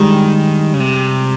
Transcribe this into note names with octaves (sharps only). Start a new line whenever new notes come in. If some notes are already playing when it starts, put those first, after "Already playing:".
Already playing: D#3 G3 G#3
C#3
C3